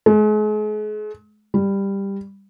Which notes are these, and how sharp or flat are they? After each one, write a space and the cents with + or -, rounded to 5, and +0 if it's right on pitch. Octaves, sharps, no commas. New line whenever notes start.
G#3 +40
G3 +10